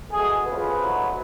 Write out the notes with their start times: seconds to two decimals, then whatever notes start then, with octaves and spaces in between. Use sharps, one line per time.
0.12 B2 A3 G#4
0.46 F2 C#3 F3 B4
0.80 G#2 F#3 A3